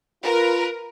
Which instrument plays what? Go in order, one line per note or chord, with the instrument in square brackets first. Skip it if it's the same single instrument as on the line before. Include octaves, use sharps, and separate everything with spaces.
[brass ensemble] F4 B4 [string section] A#4